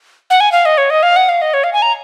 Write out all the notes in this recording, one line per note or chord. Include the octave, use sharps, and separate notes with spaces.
F#5
G#5
F5
D#5
C#5
D#5
F5
F#5
F5
D#5
C#5
F5
G#5
A#5